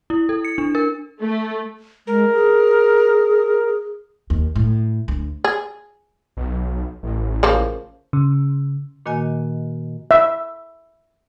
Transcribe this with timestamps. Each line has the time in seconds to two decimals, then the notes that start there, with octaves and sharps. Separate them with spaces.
0.10 E4
0.29 A4
0.45 C#7
0.58 D4
0.75 A#4
1.21 A3
2.07 G#3 A#4
2.33 G#4
4.30 D#2
4.56 A2
5.08 D2
5.44 G#4
6.37 B1
7.03 A1
7.43 C#3 F3 A#3
8.13 C#3
9.06 A#2 D#3 A#3 F#4 D#5 G#5
10.11 E5